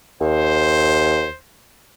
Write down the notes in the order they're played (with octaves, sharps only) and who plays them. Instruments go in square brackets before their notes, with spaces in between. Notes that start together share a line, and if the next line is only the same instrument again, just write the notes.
[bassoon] D#2 [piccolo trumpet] C5